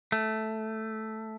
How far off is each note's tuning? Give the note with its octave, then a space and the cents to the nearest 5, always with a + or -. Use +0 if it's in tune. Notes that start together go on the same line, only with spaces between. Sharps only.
A3 -5